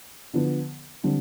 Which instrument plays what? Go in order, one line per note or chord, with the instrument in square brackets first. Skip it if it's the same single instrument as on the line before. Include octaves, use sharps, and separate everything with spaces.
[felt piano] D3 F3 B3
D3 G3 C4